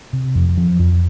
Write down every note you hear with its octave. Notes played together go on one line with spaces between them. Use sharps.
C3
F2
F3
F2